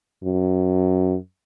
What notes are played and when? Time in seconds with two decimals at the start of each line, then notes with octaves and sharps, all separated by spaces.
0.24 F#2